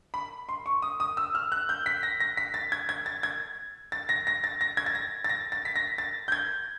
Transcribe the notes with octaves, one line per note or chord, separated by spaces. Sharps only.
B5
C6
C#6
D#6
D#6
E6
F6
F#6
G6
B6
A#6
A#6
B6
A6
G#6
G#6
A6
G#6
A6
A#6
A#6
A6
A#6
G#6
A6
A#6
A6
A#6
A6
B6
A#6
A6
G6
G#6